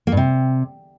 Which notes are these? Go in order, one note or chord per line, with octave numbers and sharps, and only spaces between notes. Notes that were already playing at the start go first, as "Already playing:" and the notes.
A#3
G2
C3